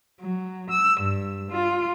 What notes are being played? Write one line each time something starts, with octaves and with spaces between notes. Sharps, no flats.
F#3
E6
G2
F4